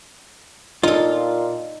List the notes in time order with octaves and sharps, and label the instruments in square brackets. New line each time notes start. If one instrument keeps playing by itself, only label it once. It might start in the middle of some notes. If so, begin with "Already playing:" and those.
[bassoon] A#2 [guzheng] D#4 A4 [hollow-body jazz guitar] F4